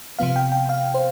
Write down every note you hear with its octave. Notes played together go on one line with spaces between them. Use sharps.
C3 F3 B3 F5
G5
G5
F5
C5